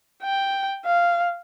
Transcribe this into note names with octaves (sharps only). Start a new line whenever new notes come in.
G5
F5